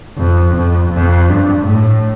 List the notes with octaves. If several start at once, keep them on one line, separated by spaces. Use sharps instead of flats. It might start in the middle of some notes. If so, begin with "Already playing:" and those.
F2
F2
F2
G2
A2